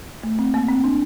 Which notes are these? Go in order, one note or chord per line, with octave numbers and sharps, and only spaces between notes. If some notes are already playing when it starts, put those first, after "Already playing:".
A3
C4
A#3
C4
D4